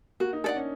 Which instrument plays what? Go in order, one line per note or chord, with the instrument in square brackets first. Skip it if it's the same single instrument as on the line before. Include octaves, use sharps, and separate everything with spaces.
[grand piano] A#3 [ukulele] F#4
[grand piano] D#4
[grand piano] D4 [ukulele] A4 D5 F#5
[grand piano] C#4